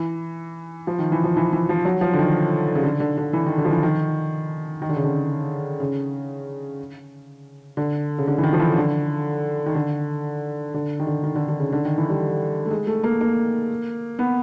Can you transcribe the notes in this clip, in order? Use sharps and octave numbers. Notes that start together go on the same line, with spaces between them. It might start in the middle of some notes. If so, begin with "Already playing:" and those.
Already playing: E3
F3
D#3
E3
F3
E3
E3
F3
F#3
F3
D3
D#3
C#3
D3
D3
D3
E3
D#3
D3
F3
E3
D#3
D#3
D3
C#3
D3
C#3
D3
C#3
D3
E3
D#3
F3
E3
C#3
D3
D#3
D3
D3
D#3
D3
D#3
D3
D3
C#3
D3
D#3
E3
G3
A3
G#3
A3
A#3
A#3
B3